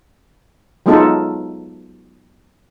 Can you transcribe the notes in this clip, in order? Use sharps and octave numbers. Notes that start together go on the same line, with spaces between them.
F#3 G#3 B3 D#4 F4 A4